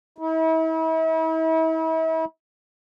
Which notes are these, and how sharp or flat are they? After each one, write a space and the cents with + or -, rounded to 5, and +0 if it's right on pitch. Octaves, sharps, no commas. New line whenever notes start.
E4 -40